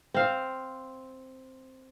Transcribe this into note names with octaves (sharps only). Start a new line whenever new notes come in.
C4 F5